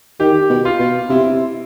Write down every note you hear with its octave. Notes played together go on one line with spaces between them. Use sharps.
D#3 G4
B2
F4
B2
C3 E4